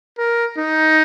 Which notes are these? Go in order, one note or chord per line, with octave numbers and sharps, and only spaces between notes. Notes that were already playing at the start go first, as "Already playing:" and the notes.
A#4
D#4